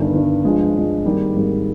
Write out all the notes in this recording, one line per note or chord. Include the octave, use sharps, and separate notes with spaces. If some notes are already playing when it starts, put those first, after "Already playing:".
Already playing: G1 G2 D#3
G1 G2 D#3
G2 F3 G#3
G2 F3 G#3
G#1 G#2 G3 A#3
G#1 G#2 G3 A#3